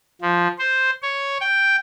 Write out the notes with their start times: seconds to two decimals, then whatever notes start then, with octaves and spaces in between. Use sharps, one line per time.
0.22 F3
0.58 C5
1.02 C#5
1.41 G5